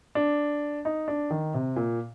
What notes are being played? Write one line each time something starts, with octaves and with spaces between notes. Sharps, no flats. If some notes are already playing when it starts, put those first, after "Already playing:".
D4
D#4
D4
D#3
C3
A#2